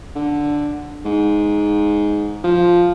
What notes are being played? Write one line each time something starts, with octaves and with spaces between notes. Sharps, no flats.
D3
G#2
F3